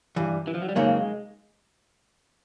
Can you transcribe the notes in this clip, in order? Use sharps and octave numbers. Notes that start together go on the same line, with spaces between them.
G2 E3 G3
E3
F3
F#3
G3
F2 C#3 F#3 G#3 A#3 D#4